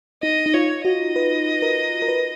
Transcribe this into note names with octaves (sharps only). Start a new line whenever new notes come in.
D#4 D#5
D#4
F4 C#5
F#4 D#5
B4
A#4
A#4
B4